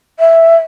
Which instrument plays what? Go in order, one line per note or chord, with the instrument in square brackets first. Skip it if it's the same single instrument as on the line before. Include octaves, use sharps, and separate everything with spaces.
[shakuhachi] E5